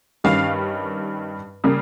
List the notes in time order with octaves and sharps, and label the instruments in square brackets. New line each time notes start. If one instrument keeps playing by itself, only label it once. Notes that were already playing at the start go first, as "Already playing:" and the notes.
[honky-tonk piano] G2 D#3 G3 C#4 F5
C#3 G3 A#3